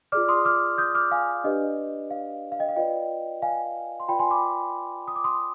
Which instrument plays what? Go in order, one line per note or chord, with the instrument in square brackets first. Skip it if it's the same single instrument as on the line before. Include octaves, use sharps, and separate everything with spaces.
[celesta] F4 G#4 D5 D6 F6
C6 D#6
D6 F6
D#6 G6
D6 F6
F5 G#5
D4 G4 B4 D5 D#5
F5
F5
D#5 G5
F5
F4 B4 D5 D#5 G5
F5 G#5
C6
F4 B4 D5 G5 B5
G#5 C6
B5 D6
D#6
D6
C6 D#6